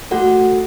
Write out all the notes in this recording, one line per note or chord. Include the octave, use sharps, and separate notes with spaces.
A3 F#4 A4 F#5